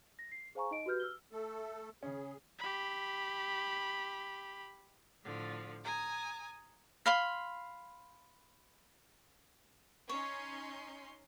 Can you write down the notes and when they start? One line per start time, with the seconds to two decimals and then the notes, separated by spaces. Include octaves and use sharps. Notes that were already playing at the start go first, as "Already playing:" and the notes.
0.19 A#6
0.32 C7
0.55 G#4 C5 F5 G#5 A#5 C#6
0.71 D#4 D#5 D7
0.86 F#4 G4 B4 F6 G6
1.00 E6 F6 G7
1.32 A3 A4
2.03 C#3 C#4 G#4
2.59 G4 B5
5.23 A2 D3 F3
5.84 G#5 A#5 D#6
7.06 F5 B5 C6
10.09 C#4 D#4 C#5 C6